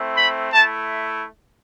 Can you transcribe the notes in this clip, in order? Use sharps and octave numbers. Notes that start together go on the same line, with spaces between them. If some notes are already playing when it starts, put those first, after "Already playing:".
Already playing: A3 C4 E4
B5
A3 E4 A5